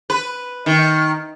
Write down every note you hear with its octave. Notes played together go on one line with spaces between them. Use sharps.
B4
D#3